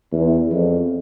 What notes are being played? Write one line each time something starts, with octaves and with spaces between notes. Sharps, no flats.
E2
F2